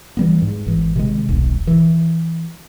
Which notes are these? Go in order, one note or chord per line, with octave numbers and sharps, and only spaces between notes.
E3 G3 B3
G#2
G#1 E3
C3 D#3 G#3
D#1 B1
E3